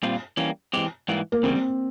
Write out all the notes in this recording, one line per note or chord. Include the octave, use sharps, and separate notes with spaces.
A#2 G3 C4 F4
E3 G3 A#3 C#4
E3 G#3 C4 G4
G#2 E3 G3 A#3
A#3
E2 C#3 G3 C4